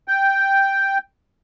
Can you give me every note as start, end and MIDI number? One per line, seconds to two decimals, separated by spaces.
0.08 0.98 79